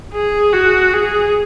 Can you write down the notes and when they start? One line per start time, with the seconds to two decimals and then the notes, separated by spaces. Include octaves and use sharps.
0.14 G#4
0.53 F#4
0.93 G#4